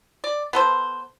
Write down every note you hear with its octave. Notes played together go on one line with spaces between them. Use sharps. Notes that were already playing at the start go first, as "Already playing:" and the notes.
D5
B3 A4 C5